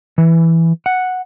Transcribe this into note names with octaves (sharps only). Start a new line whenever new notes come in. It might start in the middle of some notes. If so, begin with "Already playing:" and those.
E3
F#5